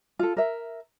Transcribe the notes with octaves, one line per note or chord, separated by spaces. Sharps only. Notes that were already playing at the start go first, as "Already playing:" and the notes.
F4 A4
A#4 E5